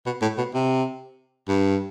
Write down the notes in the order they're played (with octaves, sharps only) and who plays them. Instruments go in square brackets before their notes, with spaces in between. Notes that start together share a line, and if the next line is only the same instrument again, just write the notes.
[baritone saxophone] B2
A2
B2
C3
G2